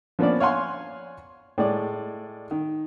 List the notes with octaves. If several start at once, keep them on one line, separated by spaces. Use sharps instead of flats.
F3 A#3 B3 C#4 D4 D5
C#5 F5 F#5 G#5 C6
A2 G#3 D5
D#3